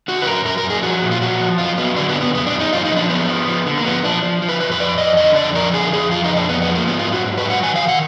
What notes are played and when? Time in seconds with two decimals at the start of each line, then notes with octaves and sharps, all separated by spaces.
0.08 D3 F#4
0.22 B4
0.26 F#2 A#4
0.45 F#2 A#4
0.58 A#4
0.64 F#2
0.70 G#4
0.83 F3 F#4
1.02 A#2
1.11 F4
1.21 F3 F#4
1.40 F3
1.58 F#2 F4
1.78 F#3 B3
1.96 D3 D4
2.09 B3
2.15 F#2
2.21 B3
2.35 F#2 B3
2.47 D4
2.53 F#2
2.60 D#4
2.72 F#2 F4
2.85 D#4
2.91 F3
2.97 D4
3.09 F#2 B3
3.29 F3
3.47 F3
3.66 D3
3.78 A#3
3.85 F3 B3
4.03 F3 D4
4.23 F3
4.42 F3
4.49 B4
4.60 F2 B4
4.72 B4
4.79 F2 D5
4.98 F2 D#5
5.17 D3 D#5
5.36 F2 D5
5.55 F3 A#4
5.73 D3 G#4
5.92 F2 G#4
6.11 F3 F4
6.24 D#4
6.30 F2
6.37 D4
6.49 F2 B3
6.62 B3
6.68 F3
6.75 A#3
6.87 G#2 B3
6.99 F4
7.05 F#3
7.13 F#4
7.25 G#2
7.38 B4
7.44 F#3
7.50 F#5
7.63 D#3 G#5
7.76 F5
7.82 D#3
7.88 F#5